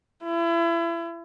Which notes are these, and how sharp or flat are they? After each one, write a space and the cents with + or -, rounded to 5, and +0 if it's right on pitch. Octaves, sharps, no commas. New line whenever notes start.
E4 +35